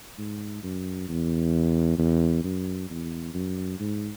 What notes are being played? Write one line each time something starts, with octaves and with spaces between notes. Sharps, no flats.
G#2
F#2
E2
E2
F#2
E2
F#2
G#2